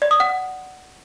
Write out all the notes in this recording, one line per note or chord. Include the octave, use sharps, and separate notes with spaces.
D5
D#6
F#5